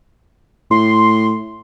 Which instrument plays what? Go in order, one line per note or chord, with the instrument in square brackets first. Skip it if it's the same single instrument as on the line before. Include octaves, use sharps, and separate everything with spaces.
[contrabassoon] A2 [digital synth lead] C6